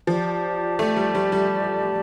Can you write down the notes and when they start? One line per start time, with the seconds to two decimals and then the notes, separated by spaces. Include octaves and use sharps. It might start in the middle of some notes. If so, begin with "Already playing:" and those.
0.07 F3 G4 D5 A5
0.79 A3
0.97 G3
1.15 G3
1.32 G3